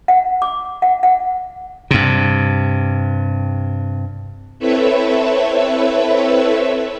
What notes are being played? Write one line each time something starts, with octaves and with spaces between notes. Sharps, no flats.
F#5
D6
F#5
F#5
G2 C3
C4 E4 A4 B4 C#5 E5